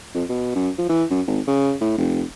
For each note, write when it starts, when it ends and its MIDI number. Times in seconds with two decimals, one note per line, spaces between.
0.14 0.24 41
0.29 0.55 47
0.55 0.70 42
0.78 0.86 53
0.89 1.04 52
1.10 1.21 42
1.27 1.40 32
1.47 1.75 49
1.81 1.97 45
1.98 2.23 29